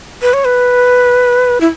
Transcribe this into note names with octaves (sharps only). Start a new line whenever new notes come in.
B4
C#5
B4
E4